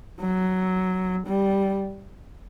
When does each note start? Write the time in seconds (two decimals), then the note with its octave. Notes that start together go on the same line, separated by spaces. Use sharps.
0.21 F#3
1.27 G3